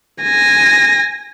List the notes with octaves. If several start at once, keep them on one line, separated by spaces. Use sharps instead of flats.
G#5 A#6